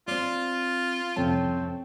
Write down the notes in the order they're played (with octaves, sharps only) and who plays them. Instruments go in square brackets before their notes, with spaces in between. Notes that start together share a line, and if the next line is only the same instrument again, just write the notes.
[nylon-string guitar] C4 D5 [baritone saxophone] F4
[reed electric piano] C2 F2 A5 [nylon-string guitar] A3 C#4 [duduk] C4